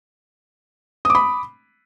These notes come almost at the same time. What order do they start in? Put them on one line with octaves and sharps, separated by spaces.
D#6 D6 B5